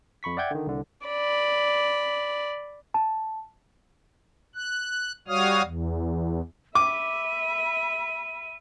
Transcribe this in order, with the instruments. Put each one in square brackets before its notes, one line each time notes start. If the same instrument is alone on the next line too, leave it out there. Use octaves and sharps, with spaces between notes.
[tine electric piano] F2 B5 C#6 B6
D5 E5 F#5 G5 G6 G#6
D3 D#3
C2 D3
[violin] D5 B5
[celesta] A5
[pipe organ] F#6
G3 F#4 C#5 F5 D#6 F6
E2
[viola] E5 B5 [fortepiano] D6 [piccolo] D#7